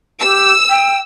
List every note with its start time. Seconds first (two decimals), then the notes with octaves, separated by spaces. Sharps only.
0.21 G4 E6
0.69 G5